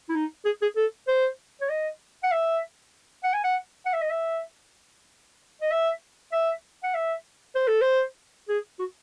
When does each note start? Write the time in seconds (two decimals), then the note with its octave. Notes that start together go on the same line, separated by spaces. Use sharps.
0.09 E4
0.15 D#4
0.45 G#4
0.62 G#4
0.77 A4
1.08 C5
1.61 C#5
1.70 D#5
2.23 F#5
2.32 E5
3.24 F#5
3.34 G#5
3.44 F#5
3.86 F#5
3.93 E5
4.02 D#5
4.10 E5
5.62 D#5
5.71 E5
6.32 E5
6.83 F#5
6.94 E5
7.55 C5
7.68 A4
7.82 C5
8.49 G#4
8.79 F#4